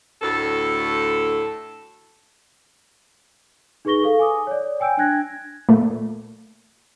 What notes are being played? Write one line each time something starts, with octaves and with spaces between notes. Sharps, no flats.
D2 A2 A4
D#4 G#4 B4 C#6 A#6 G7
A4 F5
G#5 D6 D#6
C#5 D5
G5 G#5 E6 G6 D7
D4 G5 G#5 F#6 G#6 A#6
A#2 A3